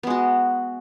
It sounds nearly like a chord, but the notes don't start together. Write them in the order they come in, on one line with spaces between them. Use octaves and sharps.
B3 G#3 F#4